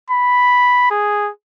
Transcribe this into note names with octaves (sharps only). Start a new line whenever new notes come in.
B5
G#4